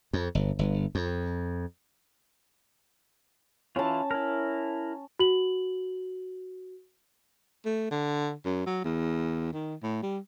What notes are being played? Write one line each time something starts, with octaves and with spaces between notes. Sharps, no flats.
F2
G1
G1
F2
E3 C#4 E4 F4 A5
E4 A#4
F#4 F#7
A3
D3
F#2
F#3
E2
D#3
A2
G3